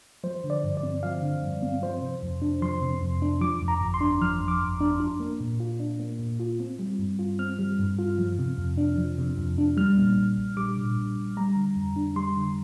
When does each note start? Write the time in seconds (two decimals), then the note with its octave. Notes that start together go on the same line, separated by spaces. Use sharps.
0.24 F3 C5
0.44 D3
0.50 D5
0.63 G2
0.77 D5
0.83 C4
1.03 F3 F5
1.22 D3
1.43 G2
1.62 C4
1.82 F3 C5
2.02 C3
2.22 F2
2.42 D4
2.62 F3 C6
2.82 C3
3.01 F2
3.22 D4
3.41 F3 D6
3.62 F2
3.68 A#5
3.81 G1
3.94 C6
4.01 D4
4.21 F3 F6
4.41 F2
4.48 D6
4.61 G1
4.80 D4
5.00 D4
5.20 A#3
5.40 A#2
5.60 F4
5.80 D4
5.99 A#3
6.19 A#2
6.40 F4
6.60 C4
6.79 G3
6.99 G2
7.19 F4
7.39 C4 F6
7.59 G3
7.79 G2
7.99 F4
8.18 F3
8.39 C3
8.58 F2
8.77 D4
8.97 F3
9.18 C3
9.37 F2
9.58 D4
9.77 G3 F6
9.97 A#2
10.17 A#1
10.37 A#1
10.57 G3 D6
10.77 A#2
10.97 A#1
11.16 A#1
11.37 G3 A#5
11.56 D3
11.76 F2
11.96 D4
12.16 G3 C6
12.36 D3